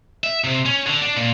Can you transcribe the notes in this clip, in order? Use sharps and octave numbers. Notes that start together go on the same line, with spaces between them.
E5
C3
C#4
D3
D4
A#2